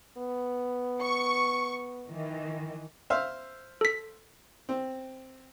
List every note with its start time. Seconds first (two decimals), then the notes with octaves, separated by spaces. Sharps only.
0.18 B3
1.01 C#6
2.08 D#3 E3
3.10 C5 E5 F5
3.81 A4 B6
4.69 C4